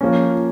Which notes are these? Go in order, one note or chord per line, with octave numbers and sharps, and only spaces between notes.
F3 A#3 C#4